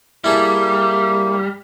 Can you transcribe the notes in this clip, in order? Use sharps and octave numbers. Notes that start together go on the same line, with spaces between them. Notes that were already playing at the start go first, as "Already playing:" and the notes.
G3 A#3 E4 G#4 A4